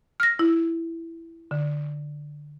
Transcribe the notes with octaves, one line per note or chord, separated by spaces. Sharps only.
F6 A#6
E4
D3